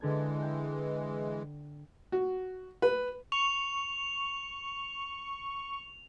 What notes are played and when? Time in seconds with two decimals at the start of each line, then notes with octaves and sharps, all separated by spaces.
0.01 D3 E3 G#3 A4 G#6
0.42 G5
2.12 F#4
2.82 B4
3.32 C#6 F7